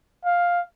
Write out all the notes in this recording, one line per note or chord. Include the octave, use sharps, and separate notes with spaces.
F5